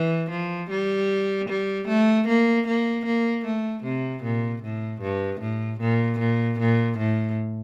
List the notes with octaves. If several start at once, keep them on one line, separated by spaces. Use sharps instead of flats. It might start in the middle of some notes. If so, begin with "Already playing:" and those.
Already playing: E3
F3
G3
G3
A3
A#3
A#3
A#3
A3
C3
A#2
A2
G2
A2
A#2
A#2
A#2
A2